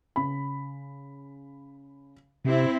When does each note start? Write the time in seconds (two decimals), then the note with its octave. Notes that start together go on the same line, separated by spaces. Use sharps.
0.16 C#3 B5
2.45 C3 C4 E4